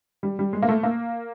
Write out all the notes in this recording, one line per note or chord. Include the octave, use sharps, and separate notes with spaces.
G3
G3
G#3
A#3
A3
A#3